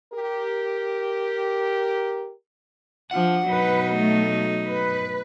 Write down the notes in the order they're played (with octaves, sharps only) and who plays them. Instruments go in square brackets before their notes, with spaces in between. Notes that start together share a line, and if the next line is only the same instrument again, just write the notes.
[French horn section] G4 A#4
[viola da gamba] F3 D4 [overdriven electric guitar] F#5
[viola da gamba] B2 F#3 D#4 [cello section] B4
[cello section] A3
B4